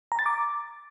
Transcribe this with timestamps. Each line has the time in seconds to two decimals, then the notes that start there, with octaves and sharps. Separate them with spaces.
0.12 A#5
0.19 A6
0.26 D6